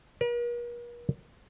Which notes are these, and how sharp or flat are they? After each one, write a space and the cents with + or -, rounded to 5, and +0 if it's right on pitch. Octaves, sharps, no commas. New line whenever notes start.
A#4 +45